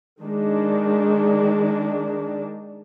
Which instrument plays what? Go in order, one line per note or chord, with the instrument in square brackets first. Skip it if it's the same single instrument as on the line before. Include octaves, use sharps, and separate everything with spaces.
[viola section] D#3 G#3 D4